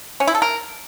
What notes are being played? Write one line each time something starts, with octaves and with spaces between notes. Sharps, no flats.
C#4
E4
A4
A#4